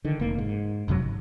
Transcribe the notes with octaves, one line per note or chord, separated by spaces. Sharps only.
D3 D#3
F1 A#3
G#2
F#1 F2 C3 F#3
G#1